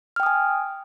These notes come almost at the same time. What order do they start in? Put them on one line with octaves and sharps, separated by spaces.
F6 G5 D#6 G#5